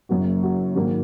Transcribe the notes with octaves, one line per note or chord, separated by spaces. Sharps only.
F#1 F#2 F#3 A#3 F#4
F#4
G#1 G#2 D#3 F#3 A#3 F#4